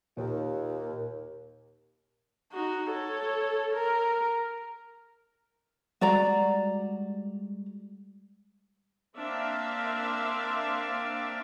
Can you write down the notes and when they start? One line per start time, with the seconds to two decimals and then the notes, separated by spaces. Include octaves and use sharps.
0.17 D#2 A#2
2.52 D#4 F#4
2.90 A4 C#5
3.74 A#4
6.01 G3 G#3 F#4 D5 A#5
9.17 A#3 C4 D4 E5 F5